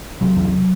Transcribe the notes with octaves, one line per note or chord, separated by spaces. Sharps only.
C3 F#3
E2